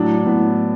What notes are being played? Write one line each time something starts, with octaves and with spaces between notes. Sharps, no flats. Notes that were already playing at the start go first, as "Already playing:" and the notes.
Already playing: A2 F#3 D4
A2 B3